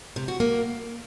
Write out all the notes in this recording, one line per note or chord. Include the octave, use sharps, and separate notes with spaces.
C3
F#4
A#3